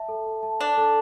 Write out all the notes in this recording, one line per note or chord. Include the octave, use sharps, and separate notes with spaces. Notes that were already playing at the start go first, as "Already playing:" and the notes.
Already playing: E5 A5
A4
E5
A5
D4 A4
A4